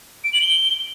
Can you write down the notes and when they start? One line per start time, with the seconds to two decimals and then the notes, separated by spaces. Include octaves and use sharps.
0.24 D7
0.33 F#7
0.42 G7